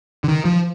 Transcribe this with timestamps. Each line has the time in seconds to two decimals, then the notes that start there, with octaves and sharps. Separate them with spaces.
0.24 D3
0.28 D#3
0.45 F3